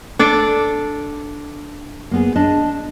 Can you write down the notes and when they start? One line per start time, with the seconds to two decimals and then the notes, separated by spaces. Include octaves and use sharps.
0.19 D4 A4 D5
2.11 A#3 B3 G#4
2.36 D4 D#5 A5